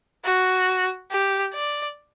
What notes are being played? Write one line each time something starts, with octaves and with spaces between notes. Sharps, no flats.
F#4
G4
D5